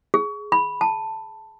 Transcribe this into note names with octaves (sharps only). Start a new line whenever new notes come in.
G#4
B5
A5